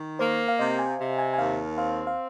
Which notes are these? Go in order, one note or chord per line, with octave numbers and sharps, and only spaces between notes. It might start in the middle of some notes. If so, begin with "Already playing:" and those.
Already playing: D#3
A#3 C5
F5
C3 D#5
G#5
C3
G#5
G#5
D#2 F5
C4 F5
F5